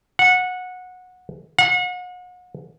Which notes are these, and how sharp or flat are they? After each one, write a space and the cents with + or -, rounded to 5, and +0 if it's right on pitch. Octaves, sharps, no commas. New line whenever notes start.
F#5 -15
F#5 -35